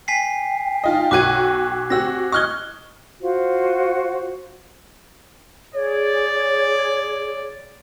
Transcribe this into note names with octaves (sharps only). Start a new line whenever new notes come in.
G5 G#5 B6 C7
D#4 F4 D#5
B1 F#4 D6 F#6 G#6 D#7
C4 F#4 G4 E6 A#6
D#5 C#6 D#6 F6 F#6 G#6 G7
F4 F#4 C5
G#4 C#5 D5